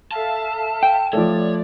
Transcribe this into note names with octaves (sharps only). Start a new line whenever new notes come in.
A4 E5 F5 A5
G5
F3 A3 C#5 D5